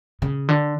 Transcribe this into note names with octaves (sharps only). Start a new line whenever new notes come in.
C#3
D3